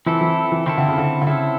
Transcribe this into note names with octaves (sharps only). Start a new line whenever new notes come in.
E3 C4 E4 A4
E3
E3
D#3 C4 E4 A4
D3
C#3
D3
D3
C#3 C4 E4 A4